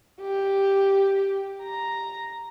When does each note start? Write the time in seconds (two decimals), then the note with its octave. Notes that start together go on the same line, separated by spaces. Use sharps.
0.21 G4
1.62 A#5